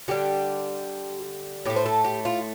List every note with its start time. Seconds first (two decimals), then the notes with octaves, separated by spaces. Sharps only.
0.08 D3 G3 G4
1.65 A2 A3 G4
1.76 C5
1.86 A4
2.04 G4
2.25 F4